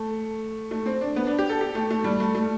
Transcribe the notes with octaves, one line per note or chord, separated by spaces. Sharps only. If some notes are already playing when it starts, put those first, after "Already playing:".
Already playing: A3
A3
C4
D4
B3
D4
G4
A4
G4
A3
A3
G3
A3
A3